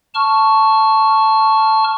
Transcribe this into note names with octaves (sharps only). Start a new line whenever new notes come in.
A5 C#6 F6